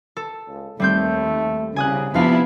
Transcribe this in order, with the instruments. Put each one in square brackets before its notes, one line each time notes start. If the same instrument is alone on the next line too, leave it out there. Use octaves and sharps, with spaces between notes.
[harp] A4
[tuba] C#2
[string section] D#2 [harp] G3 C4 G6 [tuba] A3
[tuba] C2 [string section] C#3 [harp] G#5 D#6 F#6
[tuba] C3 [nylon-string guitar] F3 D4 [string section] B3 E4 [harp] B4 F5